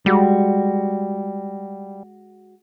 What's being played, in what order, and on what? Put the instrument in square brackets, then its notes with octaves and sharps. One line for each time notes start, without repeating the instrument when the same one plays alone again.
[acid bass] G3 [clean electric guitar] G#3 F#4